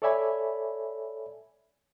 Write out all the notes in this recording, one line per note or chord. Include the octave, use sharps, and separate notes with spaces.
A4 C#5 D5 E5 G#5 B5